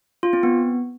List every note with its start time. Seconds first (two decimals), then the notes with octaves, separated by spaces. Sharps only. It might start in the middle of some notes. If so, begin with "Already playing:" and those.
0.23 F4
0.33 C4
0.43 B3